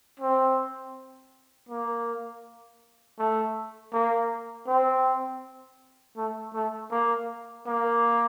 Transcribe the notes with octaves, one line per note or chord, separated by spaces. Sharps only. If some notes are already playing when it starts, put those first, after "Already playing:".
C4
A#3
A3
A#3
C4
A3
A3
A#3
A#3